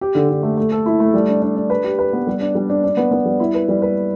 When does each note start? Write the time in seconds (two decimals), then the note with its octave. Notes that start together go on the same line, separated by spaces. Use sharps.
0.01 G4
0.15 D3
0.29 D3
0.43 A3
0.57 A3
0.72 A4
0.86 E4
1.00 A3
1.14 G3
1.28 D4
1.42 D4
1.56 D4
1.70 B4
1.84 G4
1.99 B4
2.13 B3
2.27 G3
2.41 D4
2.55 G3
2.70 D4
2.84 D4
2.97 B3
3.11 B3
3.26 G3
3.40 E4
3.54 B4
3.69 G3
3.82 B4